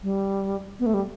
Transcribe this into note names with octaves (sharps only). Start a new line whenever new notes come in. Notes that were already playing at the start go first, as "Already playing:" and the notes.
G3
B3
A3
G3